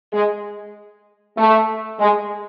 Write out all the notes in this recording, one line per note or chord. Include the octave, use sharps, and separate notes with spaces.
G#3
A3
G#3